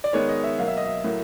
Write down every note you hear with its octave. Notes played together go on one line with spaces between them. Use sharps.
D5
D#3 G#3 B3 C#5
D#5
E5
B2 F#3 A#3 F5
E5
D#5
E5
A2 F#3 A#3